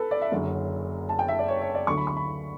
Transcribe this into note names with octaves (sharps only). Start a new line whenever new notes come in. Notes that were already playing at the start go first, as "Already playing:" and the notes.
Already playing: A4 B4
D5
E5
F#1 F#2 D3 F#3
A5
G5
E5
D5
C#5
C#5
D5
D2 D3 F#3 C#6
B5
C#6
B5